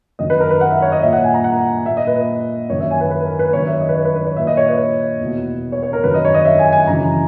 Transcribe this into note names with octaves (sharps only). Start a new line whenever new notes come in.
F#2 D#3 D#5
B4
A#4
B4
F#5
E5
C#5
D#5
A#2 E5
F#5
G#5
A#5
F#5
A#2 E5
D#5
B4
F#2 D#3 C#5
E5
G#5
B4
B4
A#4
B4
F#2 D#3 C#5
E5
D#5
B4
C#5
B4
B4
C#5
A#2 E5
D#5
C#5
B4
E2 B2
C#5
C#5
A#4
F#2 D#3 B4
D#5
C#5
D#5
E5
G#5
G#5
F#2 C#3 E3 A#5